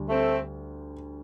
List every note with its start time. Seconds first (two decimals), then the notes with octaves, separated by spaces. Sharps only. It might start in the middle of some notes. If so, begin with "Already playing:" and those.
Already playing: D2 G3
0.09 A3 C4